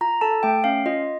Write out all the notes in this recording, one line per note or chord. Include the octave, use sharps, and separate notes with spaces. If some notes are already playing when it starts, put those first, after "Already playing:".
F4 A#5
A4 A5
A3 G5
C#4 F5
F4 D#5